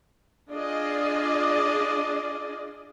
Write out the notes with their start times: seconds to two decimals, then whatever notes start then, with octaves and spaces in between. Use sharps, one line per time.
0.50 D4 F4 G#4 D5 D#5